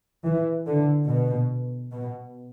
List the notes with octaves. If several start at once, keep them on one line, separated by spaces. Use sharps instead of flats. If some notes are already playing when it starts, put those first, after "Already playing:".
E3
D3
B2
B2